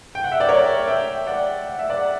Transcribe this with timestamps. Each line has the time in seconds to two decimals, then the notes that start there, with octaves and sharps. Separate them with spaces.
0.15 G5
0.24 F#5
0.32 E5
0.40 D5
0.48 A#4 C#5
0.87 E5 G5
1.27 D5 F#5
1.67 F#5
1.79 E5
1.90 D5 F#5